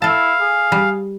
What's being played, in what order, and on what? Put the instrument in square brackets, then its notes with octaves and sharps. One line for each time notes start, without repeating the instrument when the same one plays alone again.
[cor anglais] E4 [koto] A4 A5 [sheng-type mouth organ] F5
[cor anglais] G#4
[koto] G3